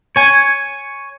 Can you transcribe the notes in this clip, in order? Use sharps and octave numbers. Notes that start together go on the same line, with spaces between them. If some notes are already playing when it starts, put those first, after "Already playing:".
C#5 G#5